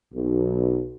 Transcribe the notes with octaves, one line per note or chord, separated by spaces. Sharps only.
B1